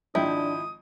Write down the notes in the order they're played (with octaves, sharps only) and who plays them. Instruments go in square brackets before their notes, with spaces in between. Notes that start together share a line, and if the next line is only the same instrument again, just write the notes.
[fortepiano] G#1 F3 G5 [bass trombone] D4 [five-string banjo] E4 [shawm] D#6